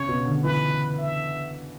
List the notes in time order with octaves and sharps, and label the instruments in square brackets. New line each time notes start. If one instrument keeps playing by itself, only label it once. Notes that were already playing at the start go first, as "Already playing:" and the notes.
Already playing: [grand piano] C#3 [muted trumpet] C#5
[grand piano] B2
D3
[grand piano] E3 [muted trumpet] B4
[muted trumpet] E5